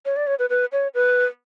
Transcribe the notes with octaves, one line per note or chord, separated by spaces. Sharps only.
C#5
D5
C#5
B4
B4
C#5
B4